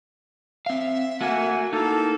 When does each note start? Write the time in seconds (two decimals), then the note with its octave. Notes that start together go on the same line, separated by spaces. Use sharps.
0.66 C4 E5 F5
1.21 A3 A#3 F#4 F#5 G#5
1.73 A#3 D#4 E4 A4